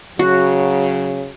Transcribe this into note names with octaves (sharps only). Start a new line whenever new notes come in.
C#3 F#3 F#4